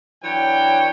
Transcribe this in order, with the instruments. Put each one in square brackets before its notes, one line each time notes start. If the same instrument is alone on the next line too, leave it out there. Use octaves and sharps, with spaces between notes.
[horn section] E3 F#3 D4 C#5 G5